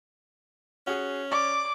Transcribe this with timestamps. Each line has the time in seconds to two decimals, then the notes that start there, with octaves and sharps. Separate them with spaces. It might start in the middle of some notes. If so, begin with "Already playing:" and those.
0.87 C#4 F#4 G#4
1.32 C#5 D5 D6